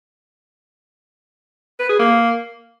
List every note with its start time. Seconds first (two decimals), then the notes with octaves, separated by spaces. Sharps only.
1.79 B4
1.89 G#4
1.99 A#3